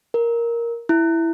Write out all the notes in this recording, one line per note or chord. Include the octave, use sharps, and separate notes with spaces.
A#4
E4